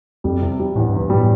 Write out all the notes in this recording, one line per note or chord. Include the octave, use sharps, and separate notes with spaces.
F2 G3
C3
G3
E2 A2
G2
E2
G2
A2 G3